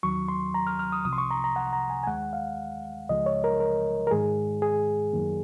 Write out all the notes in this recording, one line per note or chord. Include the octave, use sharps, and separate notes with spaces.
D#2 D#3 F#3 C#6
C6
A#5
F6
F6
D#6
C2 C3 F3 D#6
C6
C#6
A#5
A#5
F#5
A#5
G#5
G#5
D#2 D#3 G#3 F#5
F5
C#2 C#3 F3 G#3 D#5
C#5
A#4
A#4
A#4
G#2 D#3 G#3 G#4
G#4
F#2 D#3 F#3 A#3